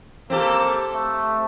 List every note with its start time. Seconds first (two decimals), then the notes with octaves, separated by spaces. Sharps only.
0.30 A#3 C4 G4 A4
0.95 A3